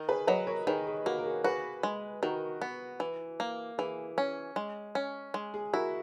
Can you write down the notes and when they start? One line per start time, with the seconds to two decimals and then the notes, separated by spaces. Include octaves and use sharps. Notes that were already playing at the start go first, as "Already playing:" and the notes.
Already playing: D#3
0.09 G#4 B4
0.27 F#3 B4 D#5
0.47 A#4 C#5
0.67 D#3 G#4 B4
0.87 G#4
1.06 A#3 F#4
1.19 A#4
1.26 G#4
1.44 F#4 G#4 B4
1.83 G#3
2.22 D#3 F#4 A#4
2.62 B3
3.00 E3
3.40 A#3
3.78 E3 G#4
4.18 C#4
4.56 G#3
4.95 C#4
5.34 G#3
5.54 G#4
5.73 E4 F#4 A#4